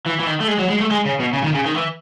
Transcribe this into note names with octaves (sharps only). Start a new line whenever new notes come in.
E3
E3
D#3
A3
G#3
F#3
G#3
A3
G#3
C#3
B2
C#3
D#3
C#3
D#3
E3